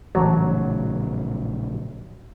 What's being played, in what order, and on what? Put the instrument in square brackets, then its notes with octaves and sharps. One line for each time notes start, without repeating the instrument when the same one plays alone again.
[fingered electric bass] A#1 A2 C#3 [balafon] E3 A5 [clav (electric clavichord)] F#3